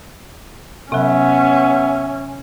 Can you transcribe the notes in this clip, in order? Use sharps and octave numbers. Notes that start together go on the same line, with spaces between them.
C3 F#3 B3 C#4 E5 B5